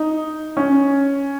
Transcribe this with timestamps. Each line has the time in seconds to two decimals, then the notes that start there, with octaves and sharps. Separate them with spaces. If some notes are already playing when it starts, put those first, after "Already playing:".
Already playing: D#4
0.57 C#4